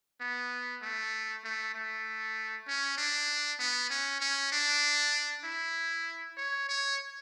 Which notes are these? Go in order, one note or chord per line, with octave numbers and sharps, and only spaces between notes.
B3
A3
A3
A3
C#4
D4
B3
C#4
C#4
D4
E4
C#5
C#5